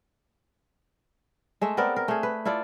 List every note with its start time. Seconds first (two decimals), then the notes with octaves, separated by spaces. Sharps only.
1.61 G#3 A3 E5
1.77 B3 C4 A#4 D5
1.96 A#4
2.08 A3 G#4
2.23 B4
2.45 E4 F4 A4 D5